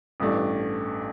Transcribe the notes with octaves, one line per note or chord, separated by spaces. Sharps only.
A1 G2 E3 A3 D4